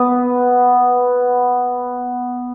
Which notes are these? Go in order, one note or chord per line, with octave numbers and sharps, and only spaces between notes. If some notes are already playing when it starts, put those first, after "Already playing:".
Already playing: B3